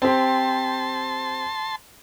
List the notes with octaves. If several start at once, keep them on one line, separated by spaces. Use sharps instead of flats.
C4 G4 A5 C6